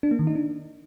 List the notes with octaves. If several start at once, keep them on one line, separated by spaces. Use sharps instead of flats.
D4
A#3
D#3
D#4
D4